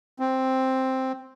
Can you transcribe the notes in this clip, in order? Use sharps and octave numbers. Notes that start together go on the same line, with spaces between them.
C4